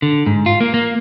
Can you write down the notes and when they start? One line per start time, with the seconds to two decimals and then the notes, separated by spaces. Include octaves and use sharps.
0.02 D3
0.26 G#2
0.46 F4
0.61 A#3
0.74 A#3